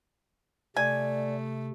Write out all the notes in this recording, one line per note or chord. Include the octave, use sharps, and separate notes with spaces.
C3 A3 D5 G#5